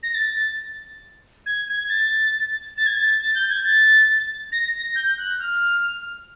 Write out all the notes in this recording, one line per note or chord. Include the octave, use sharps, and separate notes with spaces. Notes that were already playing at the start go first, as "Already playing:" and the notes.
A#6
A6
A6
G#6
G#6
A6
A6
G#6
A6
A6
G6
G#6
A6
A#6
G6
F#6
F6